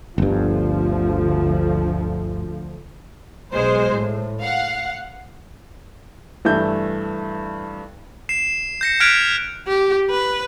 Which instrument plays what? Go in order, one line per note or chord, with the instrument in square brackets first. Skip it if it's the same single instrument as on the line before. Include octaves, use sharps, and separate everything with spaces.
[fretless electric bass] G1 G2 [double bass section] D2 F3
[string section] B1 G#3 C5
A2
F5 F#5
[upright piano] G2 E3 A3 E5 G6
[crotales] C7 E7
G6 A#6 C#7
F6 F#6 G#6 B6 D7 F7
[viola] G4
B4